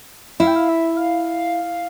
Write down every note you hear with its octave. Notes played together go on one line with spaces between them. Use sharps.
E4 F5
G5
F5
E5
F5